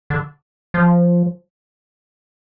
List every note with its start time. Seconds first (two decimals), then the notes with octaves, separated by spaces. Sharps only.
0.10 D3
0.74 F3